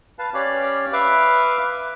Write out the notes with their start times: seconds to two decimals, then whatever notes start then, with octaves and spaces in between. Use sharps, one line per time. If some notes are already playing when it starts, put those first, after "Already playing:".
0.19 B4 F5 A5
0.34 C#4 G4 C#5 D5 F5
0.93 B4 E5 F5 D6